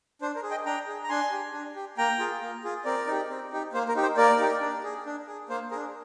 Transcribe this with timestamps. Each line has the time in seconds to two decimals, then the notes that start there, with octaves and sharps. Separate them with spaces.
0.22 D4 C5
0.36 A#4
0.43 G#4
0.51 D#5 G5
0.65 D4 G5 A#5
0.88 G#4
1.03 A#5
1.09 D4 G#5 C6
1.32 G4
1.53 D4
1.75 G4
1.98 A#3 G5 A#5
2.19 F4 G#4
2.41 A#3
2.64 F4 G#4
2.85 C4 A#4 D5
3.07 D#4 G4
3.30 C4
3.52 D#4 G4
3.73 A#3 C5
3.89 A#4
3.95 D#4 G4
4.03 C5
4.17 A#3 A#4 D5
4.39 D#4 G4
4.61 D4
4.84 G#4
5.06 D4
5.27 G#4
5.49 A#3 C5
5.71 D4 G#4 A#4